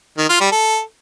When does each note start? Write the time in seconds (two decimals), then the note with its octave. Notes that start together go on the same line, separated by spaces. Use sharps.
0.18 D#3
0.29 F4
0.40 G3
0.52 A4